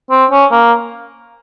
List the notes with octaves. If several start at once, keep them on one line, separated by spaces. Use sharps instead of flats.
C4
C#4
A#3